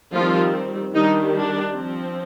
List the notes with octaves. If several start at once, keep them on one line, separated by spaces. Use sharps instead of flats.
D#3 F3 G3 C4 F4
D#3 G3 D4 D#4
D4
F3 C4